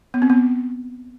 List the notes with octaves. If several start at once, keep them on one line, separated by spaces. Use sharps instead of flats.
B3
C4
B3